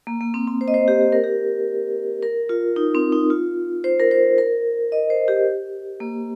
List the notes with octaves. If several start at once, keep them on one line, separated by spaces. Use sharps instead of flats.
A#3
A#3
C4
C4
C5
D#5
C5
G4
G4
A#4
G4
A#4
F4
D#4
C4
D#4
F4
C5
A#4
C5
A#4
D#5
C5
G4
A#3